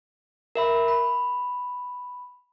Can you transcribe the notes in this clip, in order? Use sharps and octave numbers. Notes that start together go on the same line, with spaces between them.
A#4 E5 B5
B5